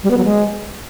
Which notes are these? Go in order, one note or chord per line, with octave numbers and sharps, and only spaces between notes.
G3
B3
F#3
G#3